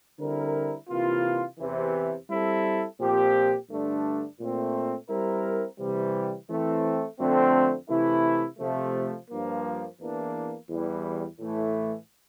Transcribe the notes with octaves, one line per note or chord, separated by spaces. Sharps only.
D3 G3 C4 E4 A#4
C3 E3 A#3 F4
E2 C3 E3
G3 C4 E4 A4
A#2 F3 C4 G4
G2 D3 A3 D4
A#2 A3 C4
G3 C4 E4 A#4
C3 E3 G3
E3 A3 C4
F2 D3 A3 C4
C3 E3 A3 E4
C3 F3 A3
G2 F3 A#3
E2 E3 A#3 D4
E2 E3 G3
A2 E3 A3